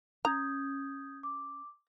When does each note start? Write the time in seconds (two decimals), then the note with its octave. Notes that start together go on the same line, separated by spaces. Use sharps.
0.25 C#4 A#5 D#6 G6 G#6
1.23 D6